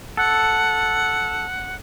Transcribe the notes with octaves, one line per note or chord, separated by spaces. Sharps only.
A4 F#5